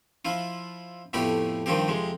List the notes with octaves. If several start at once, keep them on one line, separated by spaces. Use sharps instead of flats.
F3 E4 F4
F2 A2 A3 B3 G4 B5
G2 D#3 F3 C4 G4
F2 C3 G#3